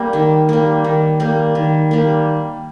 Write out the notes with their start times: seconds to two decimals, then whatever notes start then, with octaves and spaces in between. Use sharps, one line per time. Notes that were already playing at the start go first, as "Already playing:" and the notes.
Already playing: G3 A#3
0.13 D#3
0.49 G3 A#3
0.84 D#3
1.20 G3 A#3
1.55 D#3
1.91 G3 A#3